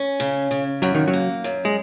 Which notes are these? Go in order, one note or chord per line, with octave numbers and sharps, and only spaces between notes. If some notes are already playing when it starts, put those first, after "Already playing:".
Already playing: C#4
C#3
C#3
F#2 F#3
D#3
F#3
A#3
F#2
G#3